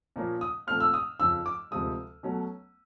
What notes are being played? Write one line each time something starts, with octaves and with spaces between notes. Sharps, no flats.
A#2 F3 A#3 C#4
D#6
A#2 F3 A3 C4 F6
E6
D#6
F2 C#3 F3 E6
D6
D2 C3 F3 G#3 D#6
B2 F#3 A3 C#4